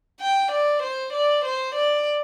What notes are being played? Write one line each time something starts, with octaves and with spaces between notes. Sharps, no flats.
G5
D5
C5
D5
C5
D5